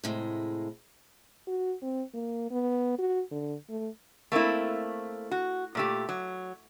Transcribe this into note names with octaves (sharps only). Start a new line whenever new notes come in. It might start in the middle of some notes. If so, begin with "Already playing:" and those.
A2 C3 G#3
F#4
C4
A#3
B3
F#4
D3
A3
A3 A#3 C4 E4
F#4
A#2 A3 G4
F#3